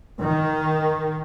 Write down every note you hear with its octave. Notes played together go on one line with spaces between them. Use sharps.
D#3